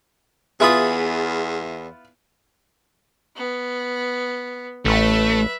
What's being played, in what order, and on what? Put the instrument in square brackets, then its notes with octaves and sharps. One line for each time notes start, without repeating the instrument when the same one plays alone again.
[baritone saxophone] E2 [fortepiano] B3 E4 F4 [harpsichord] G#4 B5 D#6
[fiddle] B3
[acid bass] A1 [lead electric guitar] A3 [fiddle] B4 E5